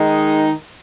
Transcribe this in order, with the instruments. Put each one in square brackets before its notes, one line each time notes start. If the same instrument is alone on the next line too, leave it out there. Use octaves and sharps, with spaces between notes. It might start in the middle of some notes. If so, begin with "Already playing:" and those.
Already playing: [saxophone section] D#3 G#3 D#4